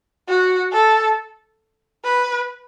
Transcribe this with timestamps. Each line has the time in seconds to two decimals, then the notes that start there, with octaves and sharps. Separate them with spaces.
0.28 F#4
0.73 A4
2.04 B4